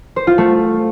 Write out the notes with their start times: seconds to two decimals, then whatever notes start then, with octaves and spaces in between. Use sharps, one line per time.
0.16 C5
0.27 F4
0.38 A3